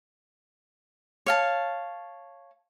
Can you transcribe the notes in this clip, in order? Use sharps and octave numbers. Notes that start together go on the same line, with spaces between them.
C#5 F5 A5